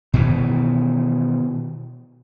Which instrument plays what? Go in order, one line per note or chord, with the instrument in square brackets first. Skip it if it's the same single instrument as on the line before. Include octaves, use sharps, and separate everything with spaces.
[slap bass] B2 D#3 E3